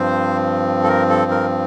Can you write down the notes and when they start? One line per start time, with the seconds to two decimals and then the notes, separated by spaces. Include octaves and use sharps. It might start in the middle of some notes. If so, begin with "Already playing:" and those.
Already playing: G2 F3 C4 C5
0.84 A4
0.88 A#4
1.10 A4
1.31 A#4